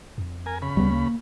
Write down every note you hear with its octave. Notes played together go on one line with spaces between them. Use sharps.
F2
A#4 G#5
C#3 B5
D2 G3 B3
A#3